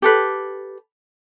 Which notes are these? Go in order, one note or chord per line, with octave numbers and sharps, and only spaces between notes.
G4 A4 B4